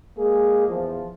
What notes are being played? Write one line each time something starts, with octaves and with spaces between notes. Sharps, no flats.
G#3 A#3 G#4
E2 F3